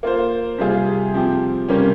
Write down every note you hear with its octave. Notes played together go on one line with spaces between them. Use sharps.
A#3 F4 C5
C3 G3 C4 F4 G#4
F3 C4 G4
C3 G3 A#3 C#4